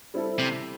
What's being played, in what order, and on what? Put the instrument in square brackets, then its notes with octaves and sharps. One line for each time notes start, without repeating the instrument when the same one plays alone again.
[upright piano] G3 C4 E4 A4
[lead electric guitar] C3